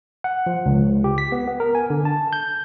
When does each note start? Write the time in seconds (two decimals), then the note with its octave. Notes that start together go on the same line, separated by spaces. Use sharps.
0.24 F#5
0.46 F3
0.66 C#2
1.04 G4
1.18 B6
1.32 B3
1.47 B3
1.60 A#4
1.75 G#5
1.90 D3
2.05 A5
2.33 G6